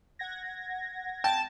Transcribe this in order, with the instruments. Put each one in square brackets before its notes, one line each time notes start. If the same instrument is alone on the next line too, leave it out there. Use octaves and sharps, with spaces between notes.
[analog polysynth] F#5 G#6 A#6
[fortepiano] G5 [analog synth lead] A5